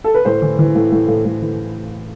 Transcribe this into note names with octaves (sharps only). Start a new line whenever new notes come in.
A4
B4
A2 C5
E3
E3
A2
A2
A2
A2
E3